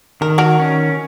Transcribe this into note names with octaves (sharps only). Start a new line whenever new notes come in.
D#3 A#4
F#4 A#4
C#4